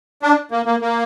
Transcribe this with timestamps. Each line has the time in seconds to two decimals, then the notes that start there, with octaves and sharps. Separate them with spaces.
0.23 D4
0.51 A#3
0.66 A#3
0.81 A#3